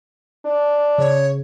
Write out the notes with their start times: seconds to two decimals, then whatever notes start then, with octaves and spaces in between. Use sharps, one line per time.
0.46 D4
0.98 C#3 C#5